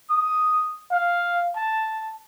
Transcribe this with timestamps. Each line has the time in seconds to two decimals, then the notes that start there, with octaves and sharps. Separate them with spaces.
0.10 D#6
0.92 F5
1.56 A5